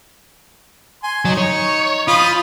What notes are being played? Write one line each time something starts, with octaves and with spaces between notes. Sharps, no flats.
G#5 C6
F#3 D#4
C#5
F3 F4 B5 D#6